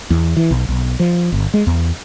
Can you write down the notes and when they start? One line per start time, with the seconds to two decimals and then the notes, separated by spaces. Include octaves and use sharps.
0.10 E2
0.37 E3
0.51 B1
0.68 B1
1.00 F3
1.32 G1
1.54 G#3
1.67 E2